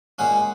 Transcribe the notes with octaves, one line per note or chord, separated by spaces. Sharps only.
A#2 G#3 C#4 F#5